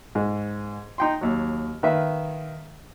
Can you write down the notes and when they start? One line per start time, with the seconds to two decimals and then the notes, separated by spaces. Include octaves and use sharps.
0.15 G#2
0.98 D#4 G5 C6
1.21 D#2 F#3
1.83 D#3 B4 E5 F5